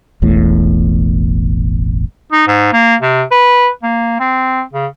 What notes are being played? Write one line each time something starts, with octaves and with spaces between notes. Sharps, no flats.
E1 A1 E2 A2
D#4
G#2
A#3
C3
B4
A#3
C4
C#3